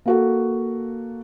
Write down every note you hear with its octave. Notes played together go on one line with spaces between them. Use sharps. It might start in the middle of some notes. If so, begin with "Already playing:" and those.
A#3 F#4 A4